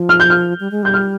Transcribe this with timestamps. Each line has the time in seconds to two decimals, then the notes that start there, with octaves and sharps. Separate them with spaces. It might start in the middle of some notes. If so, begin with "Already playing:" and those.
Already playing: F3
0.09 F6
0.20 G6
0.30 F6
0.60 G3
0.71 G#3
0.83 G3 G6
0.94 F6